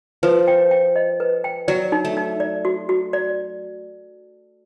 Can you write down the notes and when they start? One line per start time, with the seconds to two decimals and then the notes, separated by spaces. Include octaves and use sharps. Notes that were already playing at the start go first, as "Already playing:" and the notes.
0.23 F3 B4
0.48 G5
0.71 G5
0.96 D#5
1.20 B4
1.44 G5
1.68 F#3 D5
1.92 D#4
2.05 A3
2.17 D#4
2.40 D5
2.65 F#4
2.89 F#4
3.13 D5